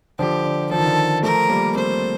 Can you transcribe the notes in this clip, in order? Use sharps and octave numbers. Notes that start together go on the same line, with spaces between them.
D3 F3 G4
D3
F3 A4
D#3
D3
D#3
F3 A3 A#4
G3 A#3
A3 C4 C5